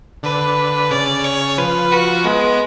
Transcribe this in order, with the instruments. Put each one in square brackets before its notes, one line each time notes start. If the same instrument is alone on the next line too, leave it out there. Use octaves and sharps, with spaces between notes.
[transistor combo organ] D3 [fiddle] B4
[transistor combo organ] C#3 [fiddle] D5
[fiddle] C#5
[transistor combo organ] F3 [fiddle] B4
[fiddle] F#4
[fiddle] G#3 [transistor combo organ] B3